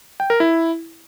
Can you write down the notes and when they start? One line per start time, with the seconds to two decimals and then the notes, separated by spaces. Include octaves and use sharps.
0.20 G5
0.30 A#4
0.40 E4